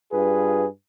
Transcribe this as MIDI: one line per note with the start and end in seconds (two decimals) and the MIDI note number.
0.11 0.65 43
0.11 0.65 65
0.11 0.65 68
0.11 0.65 71